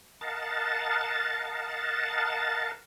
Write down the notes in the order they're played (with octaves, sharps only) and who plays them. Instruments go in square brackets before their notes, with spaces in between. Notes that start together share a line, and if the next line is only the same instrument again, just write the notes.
[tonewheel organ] A#4 D#5 F5 F#5 A5 A6